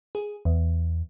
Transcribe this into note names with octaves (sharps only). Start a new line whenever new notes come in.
G#4
E2